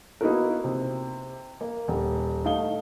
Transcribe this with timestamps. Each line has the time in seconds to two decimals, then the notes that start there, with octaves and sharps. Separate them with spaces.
0.21 A#3 B3 D#4 E4 F#4 A#4
0.64 C3
1.61 A#3
1.88 D#1
2.44 A3 D#4 F5 G7